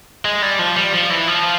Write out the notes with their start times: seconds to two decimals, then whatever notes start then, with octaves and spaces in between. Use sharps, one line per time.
0.25 G#3
0.42 G3
0.59 F3
0.76 G3
0.93 F3
1.10 E3
1.28 F3